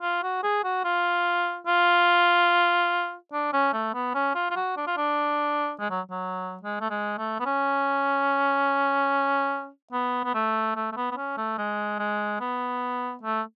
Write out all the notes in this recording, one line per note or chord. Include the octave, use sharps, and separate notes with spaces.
F4
F#4
G#4
F#4
F4
F4
D4
C#4
A3
B3
C#4
F4
F4
F#4
D4
F4
D4
G#3
F#3
F#3
G#3
A3
G#3
A3
B3
C#4
B3
B3
A3
A3
A3
B3
B3
C#4
A3
G#3
G#3
B3
A3